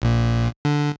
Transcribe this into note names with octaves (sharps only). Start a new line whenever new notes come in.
A#1 A#2
D3